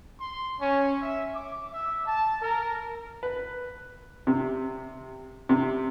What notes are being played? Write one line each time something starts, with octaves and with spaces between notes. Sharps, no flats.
C6
C#4
E5
D6
E5
A5
A#4
B4
C3
C3